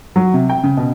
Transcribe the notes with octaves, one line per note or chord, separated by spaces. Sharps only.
F#3
C3
G5
C#3
B2